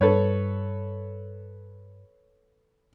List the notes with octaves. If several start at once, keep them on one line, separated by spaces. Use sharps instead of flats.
G2 A4 B4 C#5